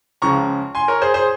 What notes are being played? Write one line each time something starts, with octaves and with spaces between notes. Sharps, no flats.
C#2 C#3 F3 A#5 C#6
G#5 C6
A#4 C#5
G#4 C5
G#4 C5